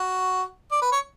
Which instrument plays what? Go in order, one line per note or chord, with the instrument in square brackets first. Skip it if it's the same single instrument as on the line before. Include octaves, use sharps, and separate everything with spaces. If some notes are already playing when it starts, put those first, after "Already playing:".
Already playing: [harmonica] F#4
D5
B4
C#5